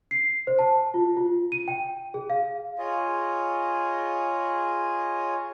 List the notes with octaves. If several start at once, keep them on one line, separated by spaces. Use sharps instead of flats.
C7
C5
A5
F4
F4
D#7
G5
G#4
F5
F4 G#4 C#5 D#5